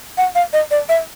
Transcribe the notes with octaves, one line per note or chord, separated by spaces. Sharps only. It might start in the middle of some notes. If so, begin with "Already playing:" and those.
F#5
F5
D#5
D5
E5